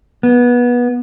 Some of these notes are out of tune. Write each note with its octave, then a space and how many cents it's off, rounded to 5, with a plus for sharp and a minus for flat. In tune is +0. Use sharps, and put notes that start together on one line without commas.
B3 -20